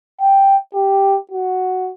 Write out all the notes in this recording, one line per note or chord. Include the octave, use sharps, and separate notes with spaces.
G5
G4
F#4